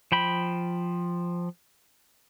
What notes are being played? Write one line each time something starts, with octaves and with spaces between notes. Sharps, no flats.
F3 G5 B5